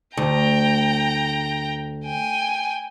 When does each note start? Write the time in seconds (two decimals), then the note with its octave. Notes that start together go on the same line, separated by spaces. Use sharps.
0.17 D2 G5 A#5
2.05 G5 G#5